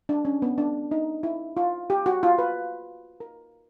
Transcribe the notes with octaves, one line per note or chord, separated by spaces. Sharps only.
D4
C#4
B3
D4
D#4
E4
F4
G4
F#4
F4
B4
A#4